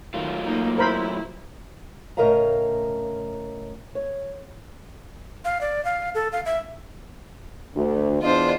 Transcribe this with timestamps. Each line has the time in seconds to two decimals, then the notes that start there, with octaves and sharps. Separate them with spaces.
0.14 D#3 F#3 A3 F4
0.45 A#3 D#4
0.78 E4 A#4 C5 B5
2.17 A2 C#3 A#4 D#5 F5 A#5
3.95 C#5
5.45 F5
5.61 D5
5.85 F5
6.15 A4
6.32 F5
6.46 E5
7.75 D2
8.22 E2 D4 F4 C5 D#5